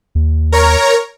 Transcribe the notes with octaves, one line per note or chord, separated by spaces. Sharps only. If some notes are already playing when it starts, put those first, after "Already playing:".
D#2
A#4 C#5 A#5